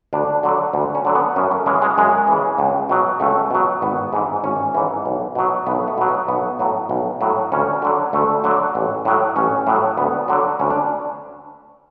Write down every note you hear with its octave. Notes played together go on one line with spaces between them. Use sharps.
D2 D4
D3 F#3
D2
C#4
D3 F#3
B3
F#2 C#4
A3
C#3 E3 G#3
G#3
F#2 G#3
C#3 E3
C#2
B2 F#3
C#2 A3
B2 F#3
G#1 B3
G#2 E3
G#1 C#4
G#2 E3
B1
B2 F#3
B1 B3
A3
B2 F#3
B3
B1 B3
A2 F#3
B1
A2 F#3
D2 C#4
D3 F#3
D2 A3
D3 F#3
A1
A2 F#3
A1 C#4
A2 F#3
D2 B3
D3 F#3
D2 C#4
D4